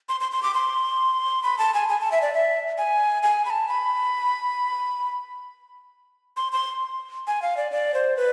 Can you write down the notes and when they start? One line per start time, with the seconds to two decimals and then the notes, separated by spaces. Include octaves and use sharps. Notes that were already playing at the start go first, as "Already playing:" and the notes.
0.09 C6
0.21 C6
0.32 C6
0.43 D6
0.54 C6
1.43 B5
1.58 A5
1.74 G#5
1.89 G#5
2.00 A5
2.12 E5
2.22 D5
2.34 E5
2.78 G#5
3.23 G#5
3.45 B5
3.50 A5
3.68 B5
6.37 C6
6.52 C6
7.27 G#5
7.42 F5
7.57 D5
7.71 D5
7.94 C5
8.17 B4